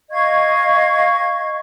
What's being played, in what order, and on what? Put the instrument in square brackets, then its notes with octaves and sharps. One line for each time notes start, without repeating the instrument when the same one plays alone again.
[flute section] D#5 F5 C#6 G#6